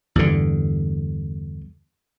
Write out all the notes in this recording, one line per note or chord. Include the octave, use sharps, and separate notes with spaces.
E2 G2 D3